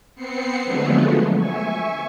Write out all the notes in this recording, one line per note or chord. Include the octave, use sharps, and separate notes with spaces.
B3 C4 C7 C#7
D3 F3 F#3 G#3 A3 B3
E5 G#5 C#6